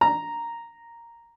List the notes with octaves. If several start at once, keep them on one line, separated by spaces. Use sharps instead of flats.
A#5